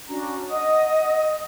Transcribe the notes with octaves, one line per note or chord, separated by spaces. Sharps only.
C#4 D4 F#4 A#5
D#5 F#5 D#6